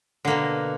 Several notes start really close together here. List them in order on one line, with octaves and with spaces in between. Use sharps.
D3 A#3 B2